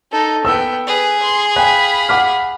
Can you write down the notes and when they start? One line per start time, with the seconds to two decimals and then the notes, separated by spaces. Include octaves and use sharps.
0.12 D#4 A4
0.45 B3 G5 E6
0.87 G#4 B4
1.23 C6
1.56 F5 G5 G#5 B5 F#6
2.09 F#5 D6 F6